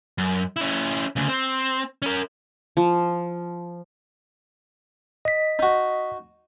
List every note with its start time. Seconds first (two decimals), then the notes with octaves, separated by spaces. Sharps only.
0.18 F#2
0.56 C#4 E4
1.16 D2 C#3
1.28 C4
2.02 C#4 A#4
2.77 F3
5.25 D#5 B6
5.59 D#4 F#4